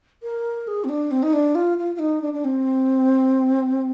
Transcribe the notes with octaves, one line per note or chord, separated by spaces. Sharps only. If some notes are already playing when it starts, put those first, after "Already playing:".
A#4
G#4
C4
D4
C4
D#4
D4
F4
F4
F4
D#4
D4
D4
C4